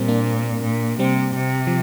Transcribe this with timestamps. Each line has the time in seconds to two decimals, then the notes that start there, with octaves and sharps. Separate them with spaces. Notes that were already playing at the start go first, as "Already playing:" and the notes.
Already playing: A#2 G3 C4
0.08 A#3 D4
0.63 A#2
0.99 C3 G3 C4
1.36 C3
1.67 F3